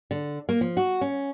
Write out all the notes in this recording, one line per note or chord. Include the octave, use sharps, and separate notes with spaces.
D3
A#3
F3
F#4
C#4